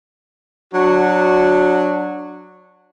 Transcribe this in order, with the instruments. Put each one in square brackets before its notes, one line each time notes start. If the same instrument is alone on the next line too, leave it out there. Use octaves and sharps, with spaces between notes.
[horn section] F#3 D4 F#4